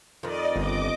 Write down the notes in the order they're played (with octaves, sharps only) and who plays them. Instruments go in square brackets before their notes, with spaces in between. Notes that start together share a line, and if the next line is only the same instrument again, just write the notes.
[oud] F2 D#3 [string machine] D5 D#5
[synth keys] G1 [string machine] D#5 D6